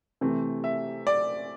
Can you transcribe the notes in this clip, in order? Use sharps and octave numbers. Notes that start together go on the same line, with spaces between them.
C3 E3 A3 C4
E5
D5